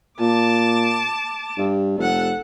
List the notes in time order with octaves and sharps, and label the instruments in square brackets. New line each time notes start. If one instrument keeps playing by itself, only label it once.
[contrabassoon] A#2 [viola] A5 D6
[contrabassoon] G2
[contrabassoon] F1 [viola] A4 F#5